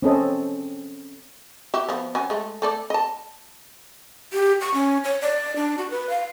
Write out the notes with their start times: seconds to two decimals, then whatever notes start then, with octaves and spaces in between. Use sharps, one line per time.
0.02 C4 C#4 A4 D#5
1.74 F#4 G4 E5
1.89 F3 B3
2.15 F#3 C#4 G#5
2.30 G#3 A3
2.62 A3 A4 D5
2.90 D#5 A5
4.33 G4
4.61 C#6
4.74 C#4
5.04 C#5
5.22 D5
5.56 D4
5.78 F#4
5.91 B4
6.09 F5